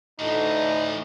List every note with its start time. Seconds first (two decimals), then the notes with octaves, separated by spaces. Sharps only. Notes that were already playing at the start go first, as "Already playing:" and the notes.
0.19 D2 A2 E3 A3 D#4